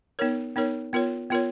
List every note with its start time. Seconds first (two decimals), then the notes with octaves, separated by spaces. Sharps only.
0.19 B3 D#4 A#4 C#5
0.56 B3 D#4 A#4 C#5
0.93 B3 F4 A#4 C#5
1.30 B3 F4 A#4 C#5